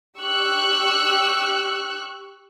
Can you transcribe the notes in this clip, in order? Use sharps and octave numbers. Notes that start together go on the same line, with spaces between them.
G4 C#6 E6 F#6